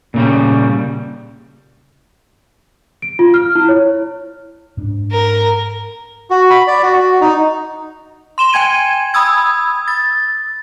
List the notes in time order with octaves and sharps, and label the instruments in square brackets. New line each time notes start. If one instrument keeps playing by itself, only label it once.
[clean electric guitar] A#2 C#3 G3
[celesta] D7
F4
F6
E4
C#5
[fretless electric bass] G#2 D4
[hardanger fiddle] A#4
[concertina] F#4
B5
D5
F#4
F#4
D#4
[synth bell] C6 E7 G7
G5 G#5 G#6 D#7
B5 D#6 E6 G#6
A6